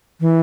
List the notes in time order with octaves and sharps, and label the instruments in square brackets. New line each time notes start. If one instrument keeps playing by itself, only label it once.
[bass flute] E3